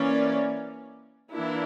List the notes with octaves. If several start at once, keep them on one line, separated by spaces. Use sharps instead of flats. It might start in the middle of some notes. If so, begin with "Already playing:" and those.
Already playing: E3 A#3 C#4 D5
E3 A#3 D4 E4